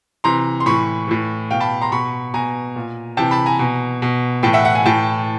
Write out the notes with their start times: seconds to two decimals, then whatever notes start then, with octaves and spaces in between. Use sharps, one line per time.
0.24 C3 E3 A#5 C6
0.60 C6
0.66 A2 E3 B5 C#6
1.08 A2 E3
1.50 B2 F5 G5
1.60 A5 B5
1.81 A#5 C6
1.92 B2 B5 C#6
2.34 B2 G#5 A#5
2.76 A#2
3.17 C3 E3 G5 A5
3.31 A5 B5
3.46 G#5 A#5
3.59 B2
4.02 B2
4.43 A2 E3 G5 A5
4.53 E5 F#5
4.64 E5 F#5
4.75 F#5 G#5
4.85 A2 E3 G5 A5